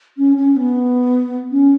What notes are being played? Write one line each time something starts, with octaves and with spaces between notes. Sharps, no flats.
C#4
C#4
B3
C#4